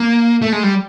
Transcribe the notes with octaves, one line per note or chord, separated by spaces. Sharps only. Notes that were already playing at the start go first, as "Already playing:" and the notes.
Already playing: A#3
A3
G#3
G3